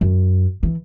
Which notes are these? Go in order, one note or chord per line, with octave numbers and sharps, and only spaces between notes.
F#2
E3